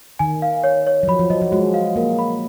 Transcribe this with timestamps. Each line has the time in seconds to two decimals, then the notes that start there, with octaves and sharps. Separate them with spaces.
0.19 D#3 G#5
0.42 F5
0.64 C#5
0.87 C#5
1.03 F#3
1.08 F3 B5
1.19 F3
1.30 F#3 D#5
1.42 F3
1.52 G#3 F#4
1.74 F5
1.96 A#3 A#4
2.19 B5